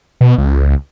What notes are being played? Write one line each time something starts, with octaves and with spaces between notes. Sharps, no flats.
B2
C#2